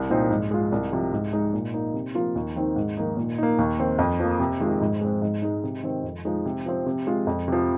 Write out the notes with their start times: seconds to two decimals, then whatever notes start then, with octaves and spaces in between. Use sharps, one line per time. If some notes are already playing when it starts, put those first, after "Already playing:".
Already playing: C2
0.10 A#2 F3 C4 D#4
0.30 G#2
0.51 G#3 F4
0.72 C2
0.93 C3 F3
1.12 G#2
1.33 G#3 D#4
1.53 A#2
1.74 A#3 D#4
1.94 C3
2.15 F3 A#3 F4
2.36 D#2
2.56 D#3 C4 D#4
2.76 G#2
2.97 D#3 A#3 D#4
3.17 A#2
3.38 A#3 D#4
3.59 D#2
3.79 D#3 C4
3.99 F2
4.20 F3 A#3
4.40 C3
4.60 D#3 G#3 F4
4.81 G#2
5.01 G#3 C4
5.22 G#2
5.42 G#3 D#4
5.64 C3
5.83 D#3 C4
6.04 F2
6.25 F3 G#3 D#4
6.45 C3
6.66 F3 C4
6.86 C3
7.07 G#3 F4
7.27 F2
7.48 C3 F3